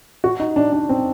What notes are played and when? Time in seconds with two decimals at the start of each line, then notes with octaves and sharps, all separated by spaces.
0.24 F#4
0.39 D#4
0.56 D4
0.72 D4
0.89 C4